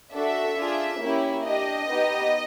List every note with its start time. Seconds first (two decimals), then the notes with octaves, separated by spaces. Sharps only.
0.13 D4 F#4 A4 E5
0.57 D4 F4 G#4
1.00 A#3 C#4 E4 G4
1.45 D4 G4 D#5
1.88 B3 D#4 G4